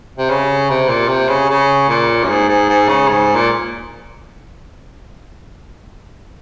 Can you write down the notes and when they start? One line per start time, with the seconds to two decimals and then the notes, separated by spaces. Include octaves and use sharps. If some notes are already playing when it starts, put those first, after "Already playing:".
0.18 C3
0.30 C#3
0.70 C3
0.89 A#2
1.08 C3
1.29 C#3
1.49 C#3
1.89 A#2
2.23 F#2
2.29 G#2
2.48 G#2
2.69 G#2
2.88 C#3
3.09 G#2
3.35 A#2